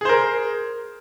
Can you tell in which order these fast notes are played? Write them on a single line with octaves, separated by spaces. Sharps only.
G#4 C5 A#4